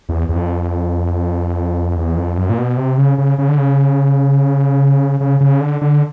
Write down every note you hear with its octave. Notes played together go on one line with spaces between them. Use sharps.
E2
E2
F2
E2
F2
F#2
A#2
B2
C3
C#3
C#3
C#3
D3
C#3
C#3
C#3
D3
D3